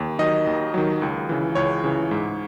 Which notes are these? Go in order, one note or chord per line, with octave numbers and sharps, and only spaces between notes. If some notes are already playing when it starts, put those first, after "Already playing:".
Already playing: D#2
D#3 F#3 D#5
D#2
D#3 F#3
C#2
C#3 E3
C#2 C#5
C#3 E3
G#2